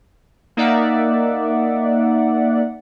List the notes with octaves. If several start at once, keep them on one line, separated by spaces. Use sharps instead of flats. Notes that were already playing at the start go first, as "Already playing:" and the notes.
A#3 D#4 D5 E5 F#5